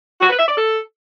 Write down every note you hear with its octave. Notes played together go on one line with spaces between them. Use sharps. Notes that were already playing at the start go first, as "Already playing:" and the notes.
F#4
B4
E5
D5
A4